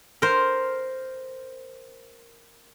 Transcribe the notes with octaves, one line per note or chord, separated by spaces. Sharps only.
A#4 C5